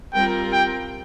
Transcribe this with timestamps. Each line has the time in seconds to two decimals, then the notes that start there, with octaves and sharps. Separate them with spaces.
0.13 G3 C4 F4 A#4 G5
0.52 G5